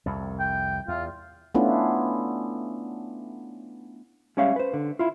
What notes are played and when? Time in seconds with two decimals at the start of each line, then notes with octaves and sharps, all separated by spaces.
0.06 C2 F2
0.40 G5
0.88 E2 F4
1.55 A3 B3 C#4 D4 E4 F4
4.37 G3 G#3 C#4 C#5 E5 F5
4.56 B4 C5
4.73 D3
4.99 E4 F4